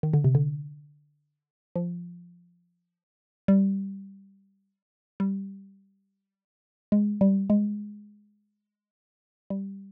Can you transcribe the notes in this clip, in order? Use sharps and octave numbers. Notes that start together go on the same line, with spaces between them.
D#3
D3
C3
D3
F3
G3
G3
G#3
G3
G#3
G3